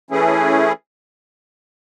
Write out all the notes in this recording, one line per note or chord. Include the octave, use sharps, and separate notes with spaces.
E3 A3 C#4 E4 G#4